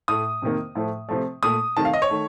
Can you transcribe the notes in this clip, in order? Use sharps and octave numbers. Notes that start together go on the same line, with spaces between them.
A2 A3 D#6
F2 C3 D#3 A#3
A2 F3 A3
C3 F3 A3
A#2 A3 D#6
C3 D#3 A3 A5
F5
D#5
C#5
D#3 A3